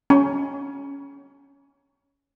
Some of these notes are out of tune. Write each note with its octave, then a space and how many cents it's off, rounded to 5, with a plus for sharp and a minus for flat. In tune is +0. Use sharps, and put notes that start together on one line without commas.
C#4 +10